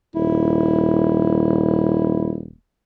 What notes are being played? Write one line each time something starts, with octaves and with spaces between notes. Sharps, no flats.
D#1 E4